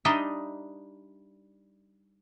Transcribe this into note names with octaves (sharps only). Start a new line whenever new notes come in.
G3 D4 D#4 D#5 E5 G5